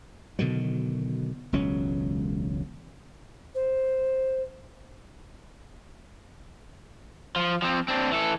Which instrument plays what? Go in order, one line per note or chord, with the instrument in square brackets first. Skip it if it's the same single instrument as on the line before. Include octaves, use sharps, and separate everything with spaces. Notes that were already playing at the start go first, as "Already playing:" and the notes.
[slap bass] B2 D3 D#3 F#3
E1 C#2 F#3 C#4
[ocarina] C5
[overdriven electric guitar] F3
F3 C4
C4 D4
E3 A4